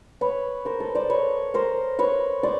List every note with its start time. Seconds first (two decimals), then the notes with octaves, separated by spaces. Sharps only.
0.21 B4 C#5
0.65 A#4 C5
0.80 A4 B4
0.95 C5 D5
1.10 B4 C#5
1.54 A#4 C5
1.99 B4 C#5
2.43 C5 D5